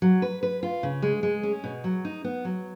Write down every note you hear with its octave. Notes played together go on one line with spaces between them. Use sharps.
F#3
B4
B4
F4
C#3
G#3
G#3
C#4
B2
F#3
D#4
B3
F#3